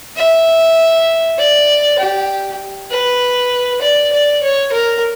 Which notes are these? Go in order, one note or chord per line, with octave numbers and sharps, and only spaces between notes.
E5
D5
G4
B4
D5
D5
C#5
A#4